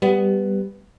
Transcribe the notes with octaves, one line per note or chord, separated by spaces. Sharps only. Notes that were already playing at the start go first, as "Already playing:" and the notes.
G3 B3